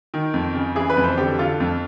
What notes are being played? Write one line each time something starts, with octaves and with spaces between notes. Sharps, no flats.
D#3
F2
C#3
E3 G#4
B4
F2
C5
D3 G4
D3 F4
F2